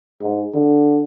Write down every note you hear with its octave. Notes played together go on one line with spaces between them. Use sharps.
G#2
D3